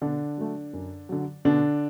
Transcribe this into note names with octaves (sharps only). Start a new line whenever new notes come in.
B2 D3 D4
F#3 A3
F#2
D3 F#3
B2 D3 D4